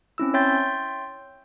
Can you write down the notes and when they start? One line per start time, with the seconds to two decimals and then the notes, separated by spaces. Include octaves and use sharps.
0.18 C4 C#4 E4 E6
0.34 C#5 E5 G5 C6 G6 A6